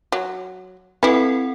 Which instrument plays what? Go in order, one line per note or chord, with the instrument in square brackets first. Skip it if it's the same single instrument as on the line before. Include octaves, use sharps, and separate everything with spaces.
[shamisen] F#3
[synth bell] C4 A4 F#5 [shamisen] E4 B4